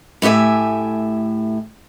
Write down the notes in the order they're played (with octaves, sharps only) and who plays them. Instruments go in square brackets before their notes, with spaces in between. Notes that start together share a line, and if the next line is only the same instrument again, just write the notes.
[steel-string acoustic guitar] A2 A3 G4 E5 G#5